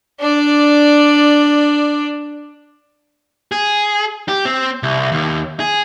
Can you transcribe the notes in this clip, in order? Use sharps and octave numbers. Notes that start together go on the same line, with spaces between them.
D4 D5
G#4
G4
C4
C2
D#2
G#4